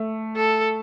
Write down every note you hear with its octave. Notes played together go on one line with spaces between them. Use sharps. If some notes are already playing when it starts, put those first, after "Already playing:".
Already playing: A3
A4